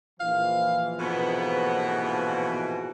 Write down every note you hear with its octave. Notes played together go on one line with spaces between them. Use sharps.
A#1 E3 F3 F5
F2 G#2 B2 B3